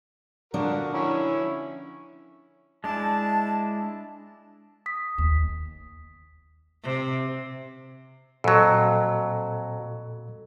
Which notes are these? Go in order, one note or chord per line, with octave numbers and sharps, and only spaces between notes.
D3 F3 D4 F#4 A#4
C#4 E4 C#5
G#3 D4 E4 A5
D#6 B6
D#2
C3
F2 A#2 F#3 A4 E6